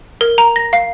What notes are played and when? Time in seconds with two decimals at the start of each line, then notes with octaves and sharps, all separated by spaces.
0.21 A#4
0.38 A#5
0.56 A#6
0.73 F5